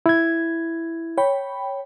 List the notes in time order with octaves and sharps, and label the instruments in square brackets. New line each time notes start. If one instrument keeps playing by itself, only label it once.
[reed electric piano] E4 G#6
[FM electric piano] C#5 G5 B5